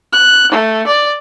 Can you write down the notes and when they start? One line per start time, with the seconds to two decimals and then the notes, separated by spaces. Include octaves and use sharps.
0.12 F#6
0.52 A3
0.87 D5